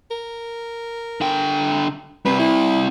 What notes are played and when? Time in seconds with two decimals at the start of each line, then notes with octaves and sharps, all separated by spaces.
0.11 A#4
1.21 D3 G5
2.26 G3 C4 B4
2.39 E4